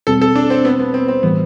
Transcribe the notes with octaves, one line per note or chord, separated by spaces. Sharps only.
E2 B2 G3 C4 A4
A4
D4
C4
B3
B3
C4
C4
A2 E3 G3 B3